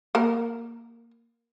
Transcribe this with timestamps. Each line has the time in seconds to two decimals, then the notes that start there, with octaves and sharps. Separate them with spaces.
0.15 A#3 A#4